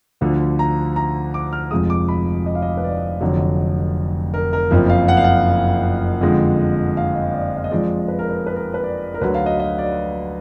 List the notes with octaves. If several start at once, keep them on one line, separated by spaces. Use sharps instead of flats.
D2 D3 F3
A#5
A#5
D6
F6
F1 F2 F3 G#3 D#6
D6
B5
D#5
F5
D#5
B4
D5
F1 F2 D3 F#3
A#4
A#4
F#1 F2 F3
F5
F#5
F5
F#5
F2 D3 F3 G#3
F5
D#5
D5
F5
D#5
F2 F3 G#3 D5
B4
A#4
B4
B4
A#4
B4
D5
A#4
D2 D3 F#3 B4
F5
D#5
D#5
D5